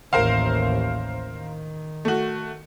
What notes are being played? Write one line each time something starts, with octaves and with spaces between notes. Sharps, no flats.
A1 D#2 A#4 C5 F5
D#3
A3 F#4